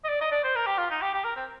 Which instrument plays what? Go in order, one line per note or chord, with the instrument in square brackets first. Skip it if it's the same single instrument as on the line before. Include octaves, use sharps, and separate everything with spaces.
[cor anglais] D#5
D5
D#5
D5
C5
A#4
G4
F4
D#4
G4
G4
A#4
C4